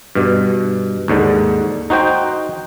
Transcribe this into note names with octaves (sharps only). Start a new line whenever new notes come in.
G2 B2
D#2 G#2 D3
D#4 F#4 C5 G5